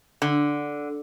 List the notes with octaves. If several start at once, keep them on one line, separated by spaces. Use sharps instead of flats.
D3